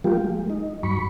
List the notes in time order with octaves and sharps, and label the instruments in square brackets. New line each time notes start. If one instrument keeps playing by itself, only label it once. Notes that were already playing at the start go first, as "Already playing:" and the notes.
[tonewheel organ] F3 F#3 G#3 A#3 F4 G4
G#3
D#4
G2 F#3 B5 C#6